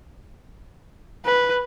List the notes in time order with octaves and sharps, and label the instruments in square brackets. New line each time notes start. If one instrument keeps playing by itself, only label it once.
[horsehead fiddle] B4